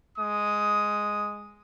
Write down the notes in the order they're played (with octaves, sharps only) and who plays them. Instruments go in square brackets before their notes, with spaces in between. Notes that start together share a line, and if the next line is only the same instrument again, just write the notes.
[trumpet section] G#3 D#6